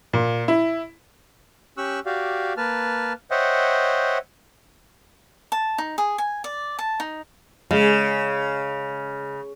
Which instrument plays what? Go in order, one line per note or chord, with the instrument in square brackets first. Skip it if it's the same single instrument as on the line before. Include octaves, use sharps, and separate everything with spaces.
[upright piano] A#2
E4
[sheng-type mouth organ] C#4 G4 C#6 E6 F#6
F#4 G4 D5 F5
A#3 B4 A5 F6
C5 C#5 D#5 E5 F#5 G5
[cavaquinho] A5
D#4
G#4
G#5
D5
A5
D#4
[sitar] C#3 [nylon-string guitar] G#3